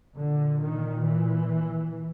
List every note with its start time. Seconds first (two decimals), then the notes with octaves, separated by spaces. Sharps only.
0.18 A#2 D3
0.62 D#3
1.06 E3